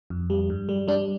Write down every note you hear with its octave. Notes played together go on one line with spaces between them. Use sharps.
F2
G3
G2
G3
G3 D4